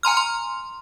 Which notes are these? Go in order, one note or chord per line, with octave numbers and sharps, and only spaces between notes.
G#5 A#5 C6 F6
C6